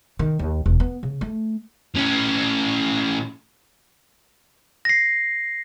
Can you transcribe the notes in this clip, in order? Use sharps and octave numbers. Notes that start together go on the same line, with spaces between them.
D#3
D#2
E1
B3
C#3
A3
A2 C#4
A#6 C7